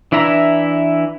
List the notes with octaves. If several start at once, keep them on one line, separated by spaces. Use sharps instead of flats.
E3 D4 E4 E5 A#5